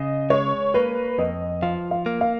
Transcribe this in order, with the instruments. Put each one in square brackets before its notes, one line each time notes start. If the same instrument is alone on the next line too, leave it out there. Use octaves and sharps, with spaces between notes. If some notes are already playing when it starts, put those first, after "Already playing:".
Already playing: [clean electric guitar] C#3 [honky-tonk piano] D#5
[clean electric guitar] G#3 [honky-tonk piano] C#5
[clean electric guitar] A#3 [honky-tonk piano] B4
[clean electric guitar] F2 [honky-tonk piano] D#5
[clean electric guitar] F3 [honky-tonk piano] F5
[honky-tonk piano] F5
[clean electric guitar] A#3
[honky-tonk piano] F5